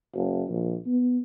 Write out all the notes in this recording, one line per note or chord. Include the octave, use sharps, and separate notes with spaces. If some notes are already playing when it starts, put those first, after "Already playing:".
F#1
A#1
B3